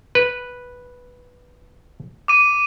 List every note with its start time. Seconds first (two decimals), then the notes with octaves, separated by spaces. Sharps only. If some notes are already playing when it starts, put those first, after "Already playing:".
0.15 B4
2.28 D6 D#7